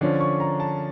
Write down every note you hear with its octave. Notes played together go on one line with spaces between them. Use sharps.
D3 F3 C#4 D5
C#6
A#5
A5